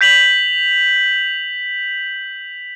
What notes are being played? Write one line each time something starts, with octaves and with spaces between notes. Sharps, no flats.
G6 B6 F7 F#7